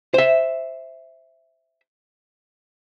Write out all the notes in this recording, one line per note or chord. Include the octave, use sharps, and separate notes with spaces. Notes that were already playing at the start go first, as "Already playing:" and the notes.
C5 E5